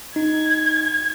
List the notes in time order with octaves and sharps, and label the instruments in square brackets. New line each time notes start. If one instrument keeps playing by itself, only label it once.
[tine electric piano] D#4 [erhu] G#6